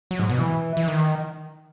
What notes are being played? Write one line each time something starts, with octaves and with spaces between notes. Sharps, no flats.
F#3
G#2
B2
E3
E3
D#3